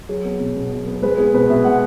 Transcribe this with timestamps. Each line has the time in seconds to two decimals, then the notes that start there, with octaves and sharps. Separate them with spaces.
0.09 F#3 G#4
0.25 B3
0.40 B2
0.56 B2
0.72 F#3
0.86 B3
1.02 G#3 B4
1.18 B3 G#4
1.34 B2 B4
1.49 B2 E5
1.64 G#3 F#5